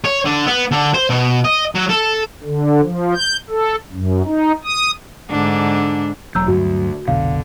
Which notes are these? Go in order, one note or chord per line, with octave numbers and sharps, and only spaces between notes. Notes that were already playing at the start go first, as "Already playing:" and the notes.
C#5
D3
B3
D3
C5
B2
D#5
F#3
A4
D3
F3
G6
A4
F#2
D#4
D#6
G#2 D3 D4
E1 F#3 A#5 E6 G6
D2 G2 F#3 F#4
F1 B1 B2 D3 F5